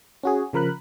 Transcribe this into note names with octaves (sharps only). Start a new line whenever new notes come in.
C#4 F#4 G#4
C#3 F3 A#4 B5 F#6